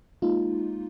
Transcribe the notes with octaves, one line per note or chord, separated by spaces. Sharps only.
G#3 A#3 D#4 F4